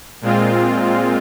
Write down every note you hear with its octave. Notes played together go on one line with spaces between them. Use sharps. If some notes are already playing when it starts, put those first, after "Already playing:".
A#2 G#3 C4 F4